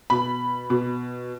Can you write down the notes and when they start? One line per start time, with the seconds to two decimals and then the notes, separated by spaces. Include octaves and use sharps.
0.10 B2 B5
0.70 B2